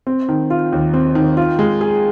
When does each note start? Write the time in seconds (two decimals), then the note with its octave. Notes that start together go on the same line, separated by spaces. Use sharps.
0.07 C4
0.29 D#3
0.50 F4
0.72 D#2
0.94 C4
1.15 D#3
1.37 F4
1.59 G#3
1.81 G#4